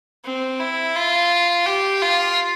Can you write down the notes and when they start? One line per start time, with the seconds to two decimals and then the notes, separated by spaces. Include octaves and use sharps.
0.25 C4
0.60 E4
0.96 F4
1.66 G4
2.02 F4